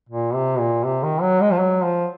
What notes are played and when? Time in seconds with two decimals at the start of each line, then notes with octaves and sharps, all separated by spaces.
0.09 A#2
0.35 C3
0.60 A#2
0.84 C3
1.03 D#3
1.22 F#3
1.41 G#3
1.52 F3
1.60 F#3
1.84 F3